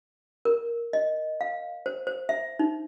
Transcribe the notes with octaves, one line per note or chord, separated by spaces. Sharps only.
A#4
D#5
F5
C5
C5
E5
D#4